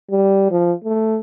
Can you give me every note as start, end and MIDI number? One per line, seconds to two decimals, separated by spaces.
0.11 0.46 55
0.51 0.73 53
0.84 1.20 57